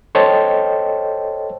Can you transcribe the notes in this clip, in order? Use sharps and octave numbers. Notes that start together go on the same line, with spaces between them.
A4 C5 C#5 D#5 G5 A5